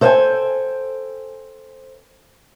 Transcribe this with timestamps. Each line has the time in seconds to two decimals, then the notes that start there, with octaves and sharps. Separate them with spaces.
0.01 A4 C5 D5 F5 G5 G#5